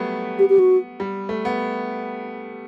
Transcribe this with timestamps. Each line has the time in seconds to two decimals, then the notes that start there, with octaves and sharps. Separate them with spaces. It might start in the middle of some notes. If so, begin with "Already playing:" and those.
Already playing: F#3 G3 A3 B3
0.39 G4
0.49 G4
0.59 F#4
1.00 G3
1.29 A3
1.45 B3